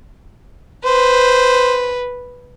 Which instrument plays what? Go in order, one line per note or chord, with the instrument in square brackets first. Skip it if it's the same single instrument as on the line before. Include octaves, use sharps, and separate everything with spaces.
[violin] B4 [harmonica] C5